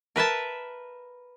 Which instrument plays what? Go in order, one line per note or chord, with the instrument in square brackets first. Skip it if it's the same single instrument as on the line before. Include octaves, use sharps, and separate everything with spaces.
[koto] A#4 B4 E5 A5